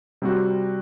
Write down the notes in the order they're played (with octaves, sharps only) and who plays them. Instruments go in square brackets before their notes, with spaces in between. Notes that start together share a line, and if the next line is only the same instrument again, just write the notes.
[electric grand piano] C3 G3 C4 F#4